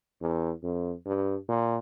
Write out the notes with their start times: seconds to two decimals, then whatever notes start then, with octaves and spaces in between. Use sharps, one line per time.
0.21 E2
0.63 F2
1.06 G2
1.48 A#2